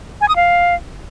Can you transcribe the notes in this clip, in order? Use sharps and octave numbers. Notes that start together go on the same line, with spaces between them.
G#5
D#6
F5